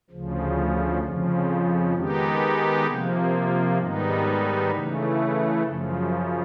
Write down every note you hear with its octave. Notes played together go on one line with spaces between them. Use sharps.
D2 C#3 F3
F2 C#3 F3
D#3 G#3 B3 D#4 G4
C3 F3 A#3
G#2 D#3 G3 B3 D#4
C#3 E3 A3
F#2 C#3 F3